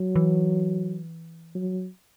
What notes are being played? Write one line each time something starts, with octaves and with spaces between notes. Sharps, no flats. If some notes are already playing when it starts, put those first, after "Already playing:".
Already playing: F#3
E3
F#3